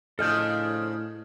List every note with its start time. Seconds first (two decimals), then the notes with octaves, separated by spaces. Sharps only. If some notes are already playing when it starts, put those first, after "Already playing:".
0.19 A2 C#3 F3 D4 A4 D#5 F6 G6